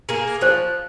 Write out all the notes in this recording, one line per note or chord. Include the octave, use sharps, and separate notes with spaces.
A#3 G#4
F3 C5